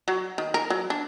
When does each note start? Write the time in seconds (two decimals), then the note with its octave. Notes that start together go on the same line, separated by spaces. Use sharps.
0.08 F#3
0.38 D#3
0.54 A#4
0.70 F#3
0.90 D4